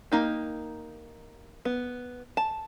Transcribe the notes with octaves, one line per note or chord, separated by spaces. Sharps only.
A#3 D#4 G4
B3
A5